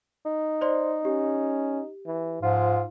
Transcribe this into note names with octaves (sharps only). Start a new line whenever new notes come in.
D#4
C5 D5 C6
C#4 G4
E3
G#2 F3 F4